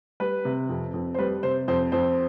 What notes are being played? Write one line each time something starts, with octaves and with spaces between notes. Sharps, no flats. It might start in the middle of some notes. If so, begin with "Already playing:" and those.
G3 B4
C3
F2
F2
C5
G3 B4
C3 C5
F2 C5
F2 C5